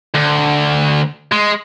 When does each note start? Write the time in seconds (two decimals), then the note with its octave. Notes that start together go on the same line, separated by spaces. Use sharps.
0.14 D2
1.32 G#3